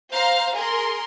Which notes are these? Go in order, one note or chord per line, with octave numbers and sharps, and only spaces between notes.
C5 F5 A#5
G#4 A#4 C6